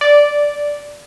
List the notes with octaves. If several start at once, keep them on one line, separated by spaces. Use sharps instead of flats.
D5